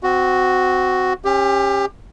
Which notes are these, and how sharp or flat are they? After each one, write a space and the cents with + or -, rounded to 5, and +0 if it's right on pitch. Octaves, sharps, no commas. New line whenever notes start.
C4 -20 F#4 +0
C#4 -20 G4 +25